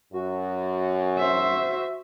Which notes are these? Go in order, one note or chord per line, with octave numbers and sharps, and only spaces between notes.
F#2 F#4
C5 E5